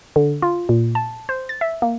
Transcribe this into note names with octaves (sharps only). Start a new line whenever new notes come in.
D3
F4
A#2
A5
C5
A6
E5
A#3